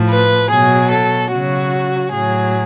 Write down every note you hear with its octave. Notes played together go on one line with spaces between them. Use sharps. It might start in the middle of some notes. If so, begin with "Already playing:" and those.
Already playing: A2 F3
B4
B2 F#3 G#4
A4
C#3 F#3 F#4
A2 F#3 G#4